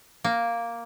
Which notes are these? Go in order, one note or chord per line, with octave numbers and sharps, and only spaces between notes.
A#3